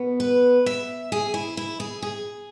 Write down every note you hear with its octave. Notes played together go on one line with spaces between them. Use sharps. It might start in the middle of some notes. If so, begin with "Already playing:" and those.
Already playing: B2 B3
B4
E5
G#4
E4
E4
G#4
G#4